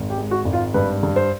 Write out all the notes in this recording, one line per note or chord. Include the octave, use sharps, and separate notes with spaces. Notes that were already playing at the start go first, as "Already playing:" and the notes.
Already playing: G#1
G4
G#3
F#4
G#1
F4
G2 B4
G2
C5